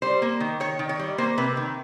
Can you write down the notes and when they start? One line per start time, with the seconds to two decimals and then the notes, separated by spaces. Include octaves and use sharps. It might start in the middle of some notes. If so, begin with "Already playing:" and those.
0.02 G3 C5
0.22 A#3
0.40 D#3
0.60 D#3 C#5
0.79 D#3
0.89 C#5
0.99 G3
1.18 A#3 C5
1.38 C3 B4
1.57 D#3